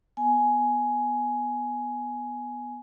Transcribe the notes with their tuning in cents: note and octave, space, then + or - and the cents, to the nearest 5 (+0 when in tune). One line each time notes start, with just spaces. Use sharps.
B3 +0 G#5 +10